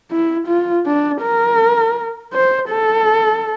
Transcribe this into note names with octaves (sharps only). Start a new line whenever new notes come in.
E4
F4
D4
A#4
C5
A4